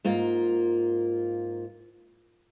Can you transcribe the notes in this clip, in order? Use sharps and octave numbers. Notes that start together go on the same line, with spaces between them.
G#2 A#3 F4